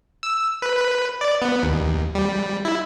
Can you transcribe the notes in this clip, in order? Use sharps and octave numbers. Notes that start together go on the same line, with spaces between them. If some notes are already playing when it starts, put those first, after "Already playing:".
E6
B4
B4
D5
B3
D#2
G3
E4